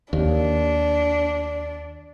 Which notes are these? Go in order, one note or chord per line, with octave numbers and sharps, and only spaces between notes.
D#2 D4